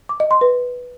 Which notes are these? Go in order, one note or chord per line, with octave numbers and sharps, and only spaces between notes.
D6
D#5
C6
B4